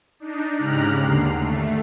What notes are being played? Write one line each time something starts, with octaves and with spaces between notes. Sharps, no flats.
D4 D#4
G#2 C#3 G4 A#5 F6 F#6
D#2 D3 C7
A3